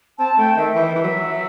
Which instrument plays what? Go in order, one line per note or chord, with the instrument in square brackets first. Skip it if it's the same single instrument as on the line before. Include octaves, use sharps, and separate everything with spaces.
[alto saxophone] C4 [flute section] A5
[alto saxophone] A3 [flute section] G5
[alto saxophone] D#3 [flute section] E5
[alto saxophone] E3 [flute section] E5
[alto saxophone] E3
F#3